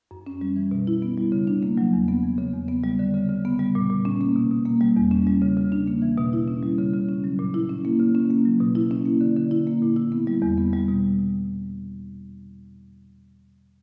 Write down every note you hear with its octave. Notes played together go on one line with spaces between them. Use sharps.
F#2
C#4
G3
E3
B2
E4
B3
G3
C#3
D4
A#3
F#3
E2
B3
E3
C#3
E2
B3
G3
D3
C#3
C#3
B3
G3
A#2
A#2
C#4
A#3
B2
B2
A#3
G3
E2
C#4
G3
C#3
C#3
D4
A#3
E3
B2
E4
C#4
G3
C#3
C#3
C#4
F#3
A#2
E4
C#4
A#3
C#3
C#4
A#3
F#3
B2
E4
C#4
A#3
D3
D3
E4
A#3
A#2
E4
B3
G3
E2
B3
G3
B2